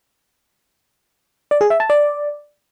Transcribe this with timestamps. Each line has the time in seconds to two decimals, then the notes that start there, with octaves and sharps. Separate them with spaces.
1.51 D5
1.61 G#4
1.70 E5
1.80 A5
1.90 D5